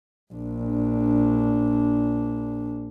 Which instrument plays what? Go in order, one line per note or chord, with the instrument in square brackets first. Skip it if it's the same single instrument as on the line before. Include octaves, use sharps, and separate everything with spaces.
[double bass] A#1 D4